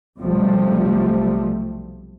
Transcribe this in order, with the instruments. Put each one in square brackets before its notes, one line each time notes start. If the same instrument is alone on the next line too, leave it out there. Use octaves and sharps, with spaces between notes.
[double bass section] B1 C3 F3 G3 A3